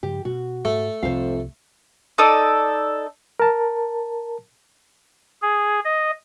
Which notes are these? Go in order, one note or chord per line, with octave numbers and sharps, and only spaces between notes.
G2 C#3 F3 G4
B2 F#4
G#2 A3
C2 F2 C3 C5 F5
D#4 A4 D5 D#6
A#4 A5
G#4
D#5